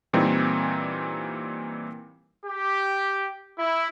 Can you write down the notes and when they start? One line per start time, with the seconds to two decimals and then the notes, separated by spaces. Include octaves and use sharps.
0.13 A#2 E3 G3 C4 D#4
2.44 G4
3.58 E4